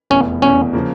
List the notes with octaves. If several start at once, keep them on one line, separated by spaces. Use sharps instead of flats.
F1 E2 B2 C#4
F1 E2 B2 C#4
C#3 F3 A#3